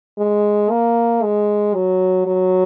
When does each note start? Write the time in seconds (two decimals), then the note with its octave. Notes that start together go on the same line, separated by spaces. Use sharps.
0.19 G#3
0.70 A#3
1.23 G#3
1.74 F#3
2.26 F#3